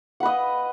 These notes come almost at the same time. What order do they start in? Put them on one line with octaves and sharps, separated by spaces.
F#5 B4 D#5